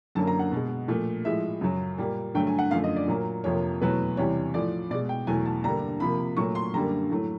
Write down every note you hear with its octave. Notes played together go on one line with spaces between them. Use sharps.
F#2 D3 F#3 A#3 A5
A#5
F#5
B2 G#3
A#2 F3 A3
A2 F3 G#3 E5
F#2 C#3 F#3
A#2 G3 A#3
G2 D3 F#3 A3 G5
G#5
F#5
F#2 D3 F3 A3 F5
D#5
D5
A#2 F#3 A#3
F2 C3 F3 A#3 C#5
E2 B2 F#3 A3 B4
E2 C3 E3 G3 C#5
A2 F3 A3 D5
B2 G#3 D5
G5
E2 B2 F#3 A3 G#5
A5
G2 D3 G3 A#3 A#5
C3 F3 A#3 B5
A#2 F#3 A3 C#6
C6
F#2 D3 G3 A#3 A#5
A2 F#3 A3